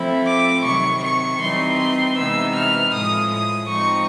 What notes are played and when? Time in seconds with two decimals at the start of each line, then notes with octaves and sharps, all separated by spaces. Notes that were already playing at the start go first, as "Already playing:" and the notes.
Already playing: F3 A3 C4 E4
0.26 D6
0.64 C3 D#3 F#3 C#6
1.02 C#6
1.40 E3 G3 C4 D#4 C6
1.78 C6
2.16 C3 E3 G#3 B3 D#4 E6
2.55 F6
2.92 A2 F3 G#3 D#6
3.30 D#6
3.68 F3 G#3 C4 D#4 C#6